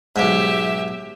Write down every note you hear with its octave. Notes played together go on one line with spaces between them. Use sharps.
B1 G#2 G4 E5